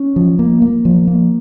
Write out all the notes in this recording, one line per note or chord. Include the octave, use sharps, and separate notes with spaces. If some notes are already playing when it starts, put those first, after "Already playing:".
Already playing: C#4
F3
A#3
A#3
F3
A#3